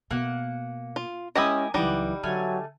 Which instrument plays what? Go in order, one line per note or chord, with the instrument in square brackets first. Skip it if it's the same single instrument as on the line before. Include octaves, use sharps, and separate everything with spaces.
[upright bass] B2 [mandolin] A#3 F#5
[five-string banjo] F4
[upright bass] G#3 [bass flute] C#4 [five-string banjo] E4 G4 D#5 [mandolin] A#4 G#5 D#6
[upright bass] C#2 F#3 [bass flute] E3 [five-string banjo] G3 D#4 [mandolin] F#5 D6
[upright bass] D3 [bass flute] F#3 [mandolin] A3 G#5 F6